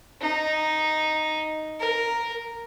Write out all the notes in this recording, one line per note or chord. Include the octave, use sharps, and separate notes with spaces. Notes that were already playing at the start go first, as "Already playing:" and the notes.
D#4
A#4